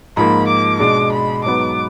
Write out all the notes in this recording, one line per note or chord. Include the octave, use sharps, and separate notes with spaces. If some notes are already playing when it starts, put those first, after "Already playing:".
G#2 F3 A#3 B5
D6
B2 G#3 D4 D6
B5
G#2 F#3 B3 D6